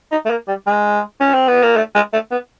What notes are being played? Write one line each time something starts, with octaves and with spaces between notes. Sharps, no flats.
D#4
A3
A#3
G3
G#3
C#4
C4
B3
A#3
A3
G#3
A3
B3